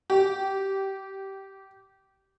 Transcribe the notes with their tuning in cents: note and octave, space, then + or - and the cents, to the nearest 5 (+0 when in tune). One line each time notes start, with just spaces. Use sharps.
G4 -15